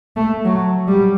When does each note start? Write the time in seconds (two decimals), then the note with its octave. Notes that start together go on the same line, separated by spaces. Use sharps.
0.16 A3
0.45 F#3
0.88 G3